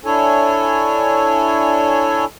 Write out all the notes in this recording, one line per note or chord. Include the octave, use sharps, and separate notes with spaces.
D4 E4 A4 C#5 G#5